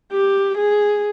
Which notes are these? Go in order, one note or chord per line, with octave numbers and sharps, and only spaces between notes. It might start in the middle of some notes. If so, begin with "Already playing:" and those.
G4
G#4